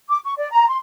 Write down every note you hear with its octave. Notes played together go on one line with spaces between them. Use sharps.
D6
C#6
D5
A#5
C6